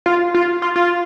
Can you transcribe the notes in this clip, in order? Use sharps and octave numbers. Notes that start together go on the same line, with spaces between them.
F4
F4
F4
F4